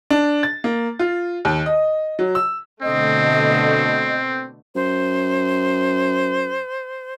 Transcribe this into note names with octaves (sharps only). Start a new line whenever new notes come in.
D4
A6
A#3
F4
D#2
D#5
F#3
E6
B2 D3 A3 C4 D#5
F#2 C5